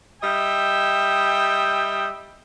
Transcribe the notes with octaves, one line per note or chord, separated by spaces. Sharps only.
G3 D#5 E5 G5